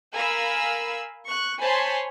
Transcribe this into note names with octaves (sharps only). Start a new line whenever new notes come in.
A#4 F5 G#5 B5 E6
C#6 F#6
C5 C#5 G#5 A5 B5 C6